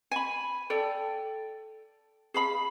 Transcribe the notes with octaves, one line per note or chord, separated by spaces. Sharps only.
G#5 B5
A4 D5 G5
G#4 F5 B5